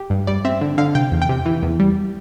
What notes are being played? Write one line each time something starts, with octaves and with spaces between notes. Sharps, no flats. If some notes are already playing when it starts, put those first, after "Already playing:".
Already playing: G4
G2
G3 D5
C4 E5
D3
D3 F5
C3 G5
E2
G5
C3
E3
E2
G3